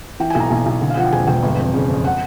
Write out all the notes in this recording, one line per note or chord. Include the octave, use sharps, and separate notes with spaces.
E3 G5
G#5
B1
A#5
B1 G#5
B1
D3
F5
F3 F#5
G5
E1 G#5
E1 G5
G1
F2
C#3
F2
F#5